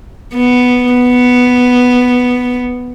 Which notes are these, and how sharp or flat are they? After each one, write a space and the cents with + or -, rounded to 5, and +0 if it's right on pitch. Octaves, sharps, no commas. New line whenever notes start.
B3 +0
B3 +0